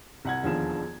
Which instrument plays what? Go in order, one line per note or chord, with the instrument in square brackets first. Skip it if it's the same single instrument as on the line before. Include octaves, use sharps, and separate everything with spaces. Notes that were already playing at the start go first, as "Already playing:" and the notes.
[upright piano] C2 F#5 G#6
E1 D#2 D3 F3 G#4 E7